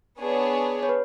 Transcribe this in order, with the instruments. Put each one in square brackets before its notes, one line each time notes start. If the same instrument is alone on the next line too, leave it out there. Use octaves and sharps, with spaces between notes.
[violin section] B3 D4 G#4 C#5
[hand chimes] C#5
B4